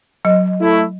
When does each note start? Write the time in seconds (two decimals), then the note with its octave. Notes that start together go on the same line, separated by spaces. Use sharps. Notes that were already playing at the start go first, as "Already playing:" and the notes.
0.25 F#3 D#5
0.61 A3 E4